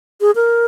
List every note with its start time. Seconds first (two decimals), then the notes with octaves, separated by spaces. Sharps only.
0.21 G#4
0.36 A#4